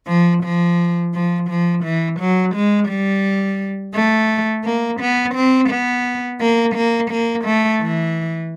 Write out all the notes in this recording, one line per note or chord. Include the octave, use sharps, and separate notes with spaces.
F3
F3
F3
F3
E3
F#3
G#3
G3
A3
A#3
B3
C4
B3
A#3
A#3
A#3
A3
E3